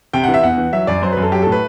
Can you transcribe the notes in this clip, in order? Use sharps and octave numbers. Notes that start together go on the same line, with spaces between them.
C3 G5
F#5
E3
E5
E2 F#5
E3
F#3 E5
F#2 D5
F#3 C5
B4
F#2
A4
F#3 G4
A4
A2
B4